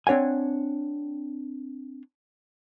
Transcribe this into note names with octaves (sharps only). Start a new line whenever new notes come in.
C4 D4 C#5 F#5 G#5